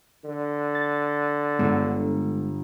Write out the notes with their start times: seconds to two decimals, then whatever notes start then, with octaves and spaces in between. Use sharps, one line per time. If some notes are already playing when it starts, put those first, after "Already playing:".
0.24 D3
0.75 A6
1.59 G1 G#3 B3